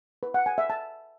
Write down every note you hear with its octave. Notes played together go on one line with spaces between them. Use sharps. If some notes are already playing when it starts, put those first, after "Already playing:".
B4
F#5
G#5
E5
A5